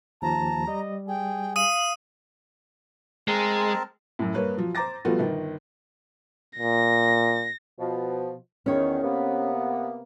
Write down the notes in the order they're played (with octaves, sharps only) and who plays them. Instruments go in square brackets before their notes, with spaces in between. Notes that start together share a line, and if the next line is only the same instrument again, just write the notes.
[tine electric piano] D#2 F3 [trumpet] A5 [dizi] A#5
[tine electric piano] G3 [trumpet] D#5
[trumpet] G#4 [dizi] G5
[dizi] F5 [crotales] D#6 D#7
[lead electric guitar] G#3 [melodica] C4 A#4 A5
[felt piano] F#2 A2
G2 A#3 B4 C#5
F3 F#3
C5 A#5 D6 A6 A#6
F3 G3 A3 B3 F4 F#4
G1 D#3
[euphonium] A#2 [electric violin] A#6
[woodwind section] B2 F3
[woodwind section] E2 D#3 [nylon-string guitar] C#4 C#5
[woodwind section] C3 A#3 B3